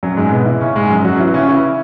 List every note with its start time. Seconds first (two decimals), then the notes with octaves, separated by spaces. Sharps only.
0.03 F#2 F#3
0.17 G#2 G#3
0.32 B2 B3
0.46 E3 E4
0.61 C#3 C#4
0.76 G#2 G#3
0.90 F#2 F#3
1.05 F#3 F#4
1.15 C#4
1.19 E3 E4
1.33 C#3 C#4
1.48 E3 E4